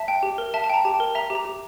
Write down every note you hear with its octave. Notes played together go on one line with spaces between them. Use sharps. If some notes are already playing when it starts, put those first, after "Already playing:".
Already playing: E5 A5
G5
G4
A#4
E5 A5
A5
G5 A#5
G4 A5
G5
A#4
E5 A#5
G4
A#5
G4